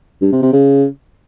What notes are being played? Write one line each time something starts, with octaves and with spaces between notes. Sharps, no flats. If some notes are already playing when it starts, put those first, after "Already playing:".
G2
C3
C3
C#3